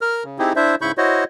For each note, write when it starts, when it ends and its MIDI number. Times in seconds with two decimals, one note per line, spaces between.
0.01 0.24 70
0.01 0.24 89
0.24 0.39 49
0.39 0.53 60
0.39 0.53 63
0.39 0.53 64
0.39 0.53 67
0.39 0.53 68
0.56 0.75 62
0.56 0.75 64
0.56 0.75 72
0.56 0.75 76
0.81 0.92 44
0.81 0.92 49
0.81 0.92 64
0.81 0.92 83
0.81 0.92 85
0.81 0.92 91
0.98 1.24 64
0.98 1.24 66
0.98 1.24 72
0.98 1.24 73
0.98 1.24 75